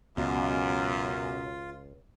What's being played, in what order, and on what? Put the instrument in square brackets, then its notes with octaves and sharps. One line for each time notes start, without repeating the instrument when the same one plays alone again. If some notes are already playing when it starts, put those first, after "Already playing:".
[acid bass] C#2 [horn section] F#2 [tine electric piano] B2 [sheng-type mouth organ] F4